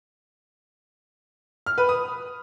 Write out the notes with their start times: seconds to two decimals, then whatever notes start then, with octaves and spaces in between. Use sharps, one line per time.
1.66 F6
1.78 B4
1.89 D#6